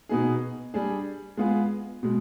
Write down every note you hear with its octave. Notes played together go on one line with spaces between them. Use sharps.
B2 B3 D#4 G#4
G3 D4 G#4
G#3 B3 F4 G#4
B2 G#3